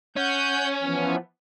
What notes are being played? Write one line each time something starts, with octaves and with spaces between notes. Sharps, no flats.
C#4 F#5 G6
E3 F3 B3